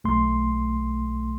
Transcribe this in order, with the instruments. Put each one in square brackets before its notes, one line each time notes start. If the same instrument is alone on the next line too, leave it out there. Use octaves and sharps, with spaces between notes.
[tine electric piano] B1 A3 C6